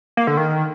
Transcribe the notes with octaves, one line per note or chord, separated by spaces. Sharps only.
A#3
D3
D#3